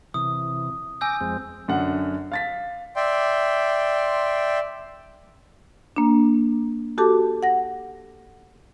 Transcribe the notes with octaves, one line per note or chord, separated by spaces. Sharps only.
C3 E3 D#6
G#5 D6 E6 G6 A#6
F2 G#3 C4
F#2 D3 F#5
F5 A6 B6
D5 E5 G5 C6
A#3 D4
F#4 G4 A4 A5 D6
F#5 A#6